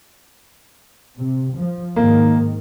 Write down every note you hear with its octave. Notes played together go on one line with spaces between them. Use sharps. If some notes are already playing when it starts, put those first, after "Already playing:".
C3
F3
G#2 D#3 A#3